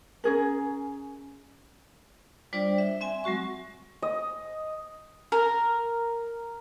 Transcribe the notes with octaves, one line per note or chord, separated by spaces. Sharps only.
C#4 G#4 A#4
G3 D4 F4 C5 D5 G5
E5
C4 E5 G#5
F#3 G#3 F#4 C#6
D#5
A#4